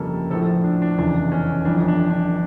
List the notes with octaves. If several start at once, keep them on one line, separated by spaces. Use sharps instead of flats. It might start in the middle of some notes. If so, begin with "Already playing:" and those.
Already playing: G1 F2 C#3 G3 A#3 A4
A#1 A2 F3 A4
D4
D4
F1 E2 C#3 E3 D4
C#4
G1 F2 E3 D4
D4
D4